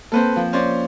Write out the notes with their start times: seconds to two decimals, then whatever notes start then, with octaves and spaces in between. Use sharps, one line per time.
0.12 A#3 C4 A4 B4 C5
0.36 F3
0.53 C#4 C5 D5